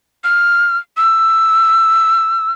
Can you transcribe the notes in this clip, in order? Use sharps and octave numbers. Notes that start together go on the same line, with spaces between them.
F6
E6